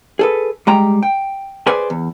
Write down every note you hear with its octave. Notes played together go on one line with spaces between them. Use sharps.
G#4 A4 B4
G3 G#3 G5 A#5
G5
G#4 B4 C5 D5 G#5
E2